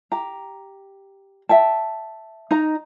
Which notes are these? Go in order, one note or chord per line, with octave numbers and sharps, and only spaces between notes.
G4 A#5
E5 G5 A5
D#4 D#5 A#5